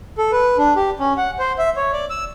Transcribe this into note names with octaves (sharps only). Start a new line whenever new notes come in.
A4
B4
D4
G4
C#4
F#5
C5
E5
C#5
D5
E6